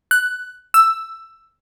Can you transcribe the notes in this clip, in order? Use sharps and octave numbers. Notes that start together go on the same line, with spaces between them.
F#6
E6